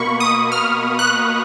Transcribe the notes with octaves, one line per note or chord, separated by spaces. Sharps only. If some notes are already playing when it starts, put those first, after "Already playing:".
Already playing: B2 A#3 B5 C#6
D#6
F6
F#6